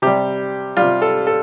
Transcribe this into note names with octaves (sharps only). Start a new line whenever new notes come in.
C3 G3 G4
C3 G3 F4
A4
A4